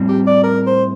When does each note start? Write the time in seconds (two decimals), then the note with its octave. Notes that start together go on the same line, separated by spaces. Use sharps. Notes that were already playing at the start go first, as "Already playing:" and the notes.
Already playing: A2 G3 C4
0.08 G4
0.26 D5
0.43 A#4
0.67 C5